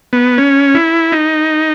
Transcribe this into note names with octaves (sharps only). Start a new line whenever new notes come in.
B3
C#4
E4
D#4